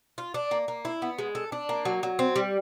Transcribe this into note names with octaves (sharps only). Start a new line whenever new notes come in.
F4
D4
A#3
A#3
E4
B3
G#3
A4
D4
A#3
F#3
F#3
C4
G3